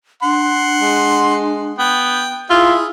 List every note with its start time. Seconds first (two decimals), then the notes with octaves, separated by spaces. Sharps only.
0.23 D4 F#5 C6
0.81 G#3
1.79 B3 G5
2.50 E4 F4 G#4 E5